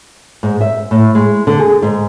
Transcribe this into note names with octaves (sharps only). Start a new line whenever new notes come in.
G#2
E5
A2
G#3
D3
G#4
G#2